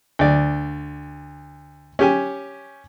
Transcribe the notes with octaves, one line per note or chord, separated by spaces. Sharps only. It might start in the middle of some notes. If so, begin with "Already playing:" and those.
D2 D5
C#4 G4 G#5